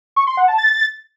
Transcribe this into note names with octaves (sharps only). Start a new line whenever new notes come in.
C#6
C6
F#5
A5
A6